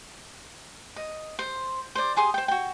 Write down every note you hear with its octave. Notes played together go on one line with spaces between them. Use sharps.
D#5
C5
C5 D5
G4 G#4 C6 D#6
C5 G5
F#4 G5